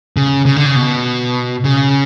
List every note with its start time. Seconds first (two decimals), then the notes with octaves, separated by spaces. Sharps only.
0.17 C#3
0.46 C#3
0.56 D3
0.66 C#3
0.75 B2
1.64 C#3